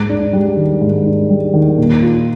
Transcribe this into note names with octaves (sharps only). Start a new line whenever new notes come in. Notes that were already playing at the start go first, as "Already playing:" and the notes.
Already playing: G#2
D4
G3
D#3
G#2
D4
G3
D#3
A#2
F4